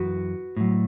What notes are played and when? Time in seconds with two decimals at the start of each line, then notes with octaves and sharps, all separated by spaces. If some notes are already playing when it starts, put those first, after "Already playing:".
Already playing: F#2 E3 F#4 B4
0.57 A2 F#3